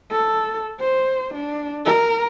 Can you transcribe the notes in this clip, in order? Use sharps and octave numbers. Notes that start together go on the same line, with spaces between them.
A4
C5
D4
A#4